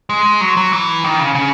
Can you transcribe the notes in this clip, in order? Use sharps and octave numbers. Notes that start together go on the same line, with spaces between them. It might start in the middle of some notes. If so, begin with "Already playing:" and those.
G#3
F#3
F#3
E3
D#3
C#3
C#3